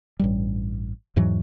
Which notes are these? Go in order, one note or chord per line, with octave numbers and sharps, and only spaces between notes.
A1 G2 G3
E2 G#2 E3 F#3